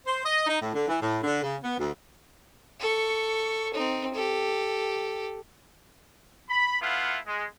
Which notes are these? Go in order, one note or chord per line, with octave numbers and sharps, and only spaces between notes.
C5
D#5
D#4
A2
D3
E3
A2
D3
C#3
B3
D2
A4 C#6
C4 D#4
G4 A4
B5
A3 B3 E4 F4 F5 F#5
G#3